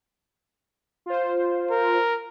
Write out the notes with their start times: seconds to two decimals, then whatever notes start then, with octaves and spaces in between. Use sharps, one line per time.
1.06 F4 C5
1.71 A#4